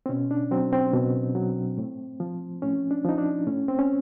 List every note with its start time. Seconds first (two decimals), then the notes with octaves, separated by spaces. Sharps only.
0.06 C4
0.09 B2 C#4
0.31 D4
0.51 F#3 C4
0.73 C4
0.94 B2
1.35 F#3
1.78 A2
2.20 F3
2.62 A2 C#4
2.91 D4
3.05 F3 D#4
3.18 D4
3.47 A2 C#4
3.68 C4
3.79 C#4